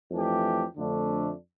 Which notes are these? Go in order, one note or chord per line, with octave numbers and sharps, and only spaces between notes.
F2 E3 A3 D4 G4
F2 D3 A3 D4